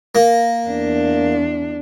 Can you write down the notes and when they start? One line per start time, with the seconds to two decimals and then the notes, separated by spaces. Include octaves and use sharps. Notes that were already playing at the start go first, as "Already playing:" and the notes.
0.15 A#3
0.69 E2 D4